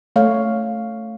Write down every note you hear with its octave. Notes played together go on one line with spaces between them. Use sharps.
A3 C#5 F5